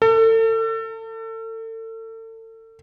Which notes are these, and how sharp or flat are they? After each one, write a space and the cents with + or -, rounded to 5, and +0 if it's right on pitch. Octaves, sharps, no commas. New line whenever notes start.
A4 +35